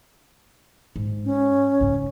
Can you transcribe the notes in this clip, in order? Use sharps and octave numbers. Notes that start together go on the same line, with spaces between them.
G#2
C#4
G#2 C#3